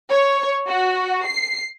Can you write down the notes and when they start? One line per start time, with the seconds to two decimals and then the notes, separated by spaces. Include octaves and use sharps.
0.11 C#5
0.68 F#4
1.26 C7